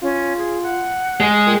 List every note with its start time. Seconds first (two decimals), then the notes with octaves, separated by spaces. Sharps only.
0.02 C#4 F4
0.37 G#4
0.62 F#5
1.20 G#3
1.47 A#2 G5